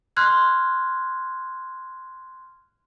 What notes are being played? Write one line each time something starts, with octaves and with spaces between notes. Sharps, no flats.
C6 F6 F#6 G#6